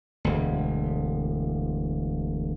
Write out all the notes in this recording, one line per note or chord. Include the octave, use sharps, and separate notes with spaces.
E1 D2